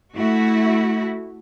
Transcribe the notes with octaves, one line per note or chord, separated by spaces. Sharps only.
A3 E4 F#4